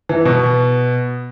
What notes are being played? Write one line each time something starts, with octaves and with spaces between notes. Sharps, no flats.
E3
B2